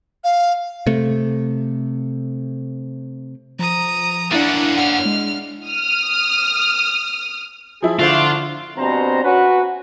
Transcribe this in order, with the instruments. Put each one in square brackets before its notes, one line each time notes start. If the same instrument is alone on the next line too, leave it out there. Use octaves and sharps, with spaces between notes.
[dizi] F5
[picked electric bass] C3 A3
[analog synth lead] F3 [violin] A#5 D#6
[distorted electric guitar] A#3 C#4 [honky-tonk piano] D4 E4 [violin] F#5 [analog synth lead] A6
[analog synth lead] F#5 [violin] F6
[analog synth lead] G#3
[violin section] D#6 F6
[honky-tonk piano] F3 E4 [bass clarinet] G#4
[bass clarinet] D3 [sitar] A3 D4 C5 [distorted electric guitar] F4
[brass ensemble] G2 B2 C4 C5 A#5
C#4 F#4 B4